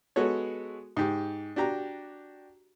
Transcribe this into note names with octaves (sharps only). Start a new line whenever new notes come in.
G#3 B3 F#4 A4 C#5
G#2 G4
D4 F#4 G4 A#5